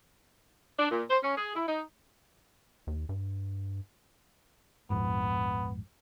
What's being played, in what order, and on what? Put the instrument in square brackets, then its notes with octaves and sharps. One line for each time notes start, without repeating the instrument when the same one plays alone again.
[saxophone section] D4
A#2
C5
C#4
G#4
E4
D#4
[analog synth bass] D#2
G2
[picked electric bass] A#1 F2 G#2 [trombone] B3